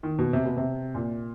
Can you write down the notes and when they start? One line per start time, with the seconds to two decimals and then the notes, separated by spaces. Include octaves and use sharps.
0.03 D#3
0.19 B2
0.33 C3
0.45 B2
0.57 C3
0.95 A#2